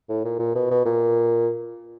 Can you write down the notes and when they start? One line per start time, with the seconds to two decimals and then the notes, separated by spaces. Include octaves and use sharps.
0.09 A2
0.24 A#2
0.39 A#2
0.55 B2
0.70 B2
0.85 A#2